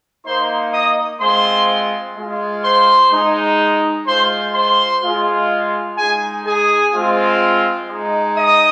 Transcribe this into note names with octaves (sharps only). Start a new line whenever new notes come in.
A#3 D#4 C5 C6
D#5 D#6
G#3 C4 F4 C5 C6
G#3 F4
C5 C6
G#3 D#4
G#3 F4 C5 C6
C5 C6
G#3 F4
G#3 D#4 G#4 G#5
G#4 G#5
G#3 C4 F4
G#3 D#4
D#5 D#6